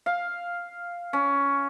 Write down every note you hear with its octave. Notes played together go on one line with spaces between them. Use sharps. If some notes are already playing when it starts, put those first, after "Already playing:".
F5
C#4